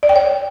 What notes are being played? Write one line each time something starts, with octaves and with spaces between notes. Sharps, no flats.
D5
G5
C#5